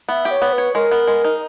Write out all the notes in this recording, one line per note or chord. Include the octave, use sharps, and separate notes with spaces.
B3 E5
G4
C#5
B3
B4
C#5
G#3 A#4
B3
G#3
D#4